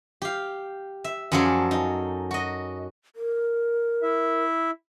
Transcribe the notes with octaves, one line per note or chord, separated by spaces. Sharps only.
G4 F5
E5
F#2 F3 F#3 G#4 A4 D5
D#4
F#4 D#5
A#4
E4 E5